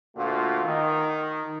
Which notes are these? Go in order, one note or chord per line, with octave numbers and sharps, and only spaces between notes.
D2 A#2 A3 F4 F#4
D#3